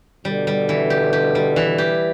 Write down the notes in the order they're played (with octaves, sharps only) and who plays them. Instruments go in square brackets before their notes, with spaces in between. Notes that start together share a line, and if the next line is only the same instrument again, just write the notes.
[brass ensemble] B2 D3 [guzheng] G3
[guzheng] G3
E3
G4
G4
G3
E3
G4